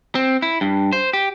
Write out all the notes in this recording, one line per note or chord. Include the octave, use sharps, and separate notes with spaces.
C4
E4
G2
C5
G4